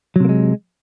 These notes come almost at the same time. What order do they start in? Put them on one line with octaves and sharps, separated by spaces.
F#3 C3 A#3 G#3